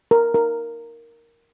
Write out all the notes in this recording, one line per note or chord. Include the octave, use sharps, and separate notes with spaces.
A#4
A#4